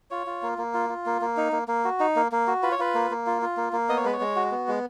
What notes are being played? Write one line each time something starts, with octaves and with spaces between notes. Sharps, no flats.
F4 C#5
F4
A#3
A#3
F4
F4
A#3
A#3
D#4
A#3
A#3
F#4
D#4
A#3
A#3
F#4
F4 B4
C#5
F4 B4
A#3
A#3
F4
F4
A#3
A#3
B3 D#5
C#5
G#3 B4
C#5
G#3
F#4
B3
G#3